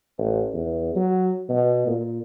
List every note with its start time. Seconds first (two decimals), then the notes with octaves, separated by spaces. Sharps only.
0.18 A1
0.54 E2
0.95 F#3
1.49 B2
1.87 A#2